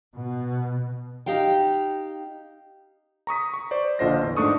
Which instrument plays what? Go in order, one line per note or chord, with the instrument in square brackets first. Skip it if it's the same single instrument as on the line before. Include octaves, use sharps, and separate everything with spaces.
[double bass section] B2
[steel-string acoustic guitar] D#4 G4 F5 G5
[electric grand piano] A#5 C#6 D#6 B6
C#6
C5 D5
A#1 D3 F4 C5 D#5 A#6
E2
G#2 A3 D4 C#6 D#6